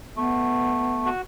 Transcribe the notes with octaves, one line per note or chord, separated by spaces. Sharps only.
A3 B3
F#4